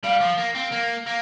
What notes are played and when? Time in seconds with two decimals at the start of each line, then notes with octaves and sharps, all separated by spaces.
0.03 G3 F5
0.20 F3
0.38 A#3
0.55 C4
0.72 A#3
1.06 A#3